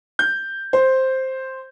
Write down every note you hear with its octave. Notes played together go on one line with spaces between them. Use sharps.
G6
C5